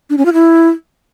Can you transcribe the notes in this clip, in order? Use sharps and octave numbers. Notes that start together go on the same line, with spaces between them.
D4
C#4
F4
E4